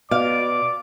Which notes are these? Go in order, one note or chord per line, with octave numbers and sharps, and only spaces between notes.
B2 D5 F5 D6